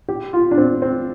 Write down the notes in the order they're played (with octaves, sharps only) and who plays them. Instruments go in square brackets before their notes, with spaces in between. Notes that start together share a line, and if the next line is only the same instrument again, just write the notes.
[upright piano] G4
F4
D4
C4
C4